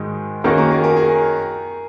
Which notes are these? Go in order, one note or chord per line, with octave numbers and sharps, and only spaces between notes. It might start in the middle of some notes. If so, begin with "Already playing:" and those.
Already playing: G#2 D#3 G#3 F#4
D#3 A#3 C#4 F#4 G#4
A#4
G#4
A#4
G#4